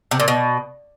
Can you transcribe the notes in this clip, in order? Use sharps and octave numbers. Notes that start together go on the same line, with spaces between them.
C3
A#2
B2